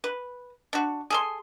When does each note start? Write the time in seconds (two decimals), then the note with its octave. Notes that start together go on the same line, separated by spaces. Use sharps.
0.04 B4
0.73 D4 F#4
1.10 G#4 A4 C6